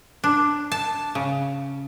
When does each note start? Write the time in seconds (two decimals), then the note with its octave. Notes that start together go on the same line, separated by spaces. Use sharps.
0.24 D4
0.72 A5
1.15 C#3